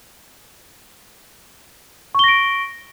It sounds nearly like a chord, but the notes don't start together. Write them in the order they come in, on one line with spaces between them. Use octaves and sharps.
C#6 G7 A#6 D7